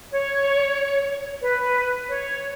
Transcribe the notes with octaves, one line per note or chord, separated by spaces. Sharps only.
C#5
B4
C#5